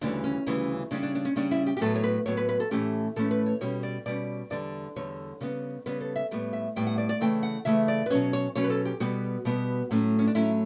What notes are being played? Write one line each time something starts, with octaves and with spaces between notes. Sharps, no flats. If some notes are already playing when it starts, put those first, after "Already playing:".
D2 C#3 E3 G3 D4
C#4
D2 C#3 E3 G3
C#3 G3 C#4 D4
D4
D4
C#4
C#3 G3 C#4 D4
E4
G4
G4
A2 F#3 B3 A4
C#5
B4
A2 F#3 B3 C#5
B4
B4
A4
A2 E3 A3 C#4 G4
A2 E3 A3 C#4 A4
B4
C#5
B2 G3 C#4 C#5
D5
B2 G3 C#4 D5
E2 D3 G3 D5
E2 D3 G3 C#5
C#3 G3 B3
C#3 G3 B3 B4
A4
E5
A2 G3 B3
E5
A2 G3 B3 G5
F#5
D5
D5
C#3 E3 A3 G5
F#5
C#3 E3 A3 E5
D5
B4
B2 F#3 C#4 C#5
C#5
B2 F#3 C#4 C#5
B4
A4
G4
B2 G3 B3 F#4
B2 G3 B3
A2 F#3 A3 C#4
C#4
D4
A2 F#3 A3 C#4 E4